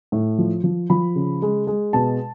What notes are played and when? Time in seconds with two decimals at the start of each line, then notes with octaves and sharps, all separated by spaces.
0.12 A2
0.38 F3
0.64 F3
0.90 F3 B5
1.16 C#3
1.42 G#3
1.67 G#3
1.93 B2 A5